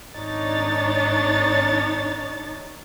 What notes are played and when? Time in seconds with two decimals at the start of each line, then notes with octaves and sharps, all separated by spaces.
0.14 G#1 D4 D#4 C#5 A6